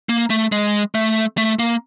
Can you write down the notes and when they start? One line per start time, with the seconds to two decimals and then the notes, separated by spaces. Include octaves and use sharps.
0.09 A#3
0.30 A3
0.52 G#3
0.95 A3
1.37 A3
1.59 A#3